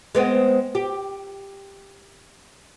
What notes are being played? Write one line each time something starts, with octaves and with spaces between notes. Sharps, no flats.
G#3 B3 C4
G4